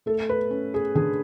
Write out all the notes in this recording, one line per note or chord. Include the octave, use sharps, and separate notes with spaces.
A3 A4
B4
C#4
G#4
D3 G#4